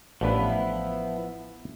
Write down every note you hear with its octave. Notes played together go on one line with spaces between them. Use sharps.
A1 F3 B3 D4 E4 B4